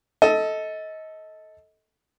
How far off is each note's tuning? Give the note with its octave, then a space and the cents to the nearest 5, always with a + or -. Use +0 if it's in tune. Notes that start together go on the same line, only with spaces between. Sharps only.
A4 +0 D#5 +25